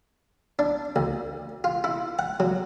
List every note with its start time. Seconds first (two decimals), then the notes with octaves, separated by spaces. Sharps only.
0.59 D4
0.96 D2
1.64 F4
1.84 E4
2.19 F#5
2.40 F#3